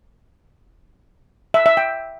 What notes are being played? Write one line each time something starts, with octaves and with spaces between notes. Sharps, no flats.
E5
E5
G5